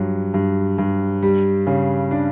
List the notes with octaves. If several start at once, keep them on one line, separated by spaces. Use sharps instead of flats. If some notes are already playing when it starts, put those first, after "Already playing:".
Already playing: G2 F#3
G2
G2
G3
C#3
D4